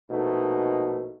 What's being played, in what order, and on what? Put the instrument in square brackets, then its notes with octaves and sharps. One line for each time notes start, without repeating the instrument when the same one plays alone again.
[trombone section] A#1 B2 A3 D#4